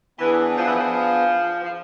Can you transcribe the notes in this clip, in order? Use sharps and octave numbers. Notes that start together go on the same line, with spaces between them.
E3 B3 D4 G#4
F3
E3
F3
F3